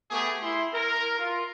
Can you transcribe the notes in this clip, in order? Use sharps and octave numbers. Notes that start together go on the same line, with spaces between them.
A3 B3 G4 G#4
E4 C6
A#4
F4